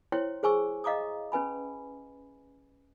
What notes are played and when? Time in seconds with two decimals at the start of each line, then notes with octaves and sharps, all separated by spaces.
0.12 E4 C5 C#5 G5 C6
0.43 G#4 C5 G#5 C#6 E6
0.84 D#5 F5 A#5 D6 D#6
1.32 C#4 B4 G#5 B5